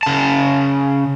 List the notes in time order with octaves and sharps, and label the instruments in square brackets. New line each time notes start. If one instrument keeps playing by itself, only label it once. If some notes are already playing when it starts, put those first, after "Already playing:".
[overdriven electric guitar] C#3 A5